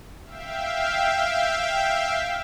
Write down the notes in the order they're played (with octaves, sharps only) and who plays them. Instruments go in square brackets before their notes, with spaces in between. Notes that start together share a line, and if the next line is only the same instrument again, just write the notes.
[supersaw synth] E5 F5 G5